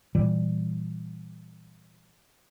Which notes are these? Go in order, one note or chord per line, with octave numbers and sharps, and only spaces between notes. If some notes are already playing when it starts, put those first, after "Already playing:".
A#2 E3 G3